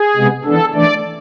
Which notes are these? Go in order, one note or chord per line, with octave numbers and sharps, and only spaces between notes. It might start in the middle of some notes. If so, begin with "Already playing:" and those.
Already playing: G#4
C3 G#3 B3
E3 B3 D4 A4
E3 A3 D4 D5